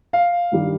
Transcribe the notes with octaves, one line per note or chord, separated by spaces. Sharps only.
F5
G2 D#3 G3